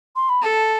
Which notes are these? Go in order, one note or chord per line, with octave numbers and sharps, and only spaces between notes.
C6
B5
A4 A5